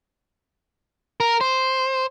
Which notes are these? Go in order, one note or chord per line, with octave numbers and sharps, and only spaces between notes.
A#4
C5